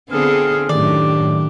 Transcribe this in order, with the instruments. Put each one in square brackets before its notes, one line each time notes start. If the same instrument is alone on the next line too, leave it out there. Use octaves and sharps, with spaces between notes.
[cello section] D3 C4 G#4 [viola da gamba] B3 F4 A4 [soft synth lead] F6
[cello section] F#2 A2 [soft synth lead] D#3 [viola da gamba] D4 G4 [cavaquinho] D5